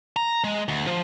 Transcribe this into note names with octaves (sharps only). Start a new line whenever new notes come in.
A#5
G#3
D2
F3